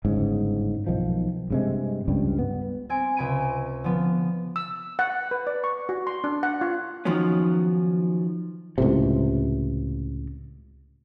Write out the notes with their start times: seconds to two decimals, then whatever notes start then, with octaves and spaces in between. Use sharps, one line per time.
0.05 G1 G#2 C#3
0.87 B1 D#3 F3
1.50 G2 C3 G#3
2.08 C#2 G2 G3
2.39 B3
2.89 C4 G#5 D7
3.16 C#2 C3 G#5 B5 D7 D#7
3.84 D3 F3 B3
4.56 E6
4.99 F#5
5.31 B4
5.47 D5
5.64 C#6
5.89 F#4
6.07 C6
6.24 D4
6.43 F#5
6.61 F4
7.05 D#3 F3 F#3 B3 C#4
8.78 C#2 A2 C3